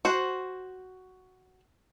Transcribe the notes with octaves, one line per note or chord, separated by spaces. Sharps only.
F#4 C5